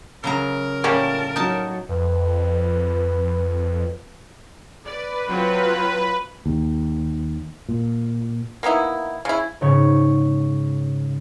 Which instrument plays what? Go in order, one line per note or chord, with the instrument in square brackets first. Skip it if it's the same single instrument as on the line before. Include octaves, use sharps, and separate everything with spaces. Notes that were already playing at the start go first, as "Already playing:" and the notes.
[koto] C#3 F#3 A#5 [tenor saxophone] A#4
[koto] A2 [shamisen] G3 A#3 C#4 [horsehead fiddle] A5
[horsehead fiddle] F#3 [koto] D#4 A5
[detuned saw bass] F2 [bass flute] B4
[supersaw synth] B4 [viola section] D5
[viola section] F#3 C4 F4
[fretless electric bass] D#2
A#2
[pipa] A#3 B3 D#4 E4
C#3 E4
[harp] G#2 C#3 C#5